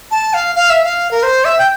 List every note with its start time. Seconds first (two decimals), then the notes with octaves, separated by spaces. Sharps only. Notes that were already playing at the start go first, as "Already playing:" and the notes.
0.11 A5
0.34 F5
0.55 F5
0.70 E5
0.84 F5
1.11 A#4
1.23 C5
1.45 E5
1.58 G5